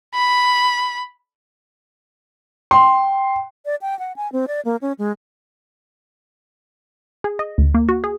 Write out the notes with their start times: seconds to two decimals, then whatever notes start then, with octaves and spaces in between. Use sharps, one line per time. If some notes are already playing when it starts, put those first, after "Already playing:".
0.15 B5
2.71 G5 C6
3.65 D5
3.82 G5
3.99 F#5
4.16 G#5
4.32 C4
4.48 D5
4.65 A#3
4.82 C#4
4.99 G#3
7.24 G#4
7.39 D#5
7.58 D2
7.74 A#3
7.89 F#4
8.04 G#4